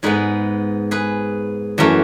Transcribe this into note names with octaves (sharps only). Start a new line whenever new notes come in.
G#2 G#3 B3 G#4 B4
G#4 B4
F#2 E3 A3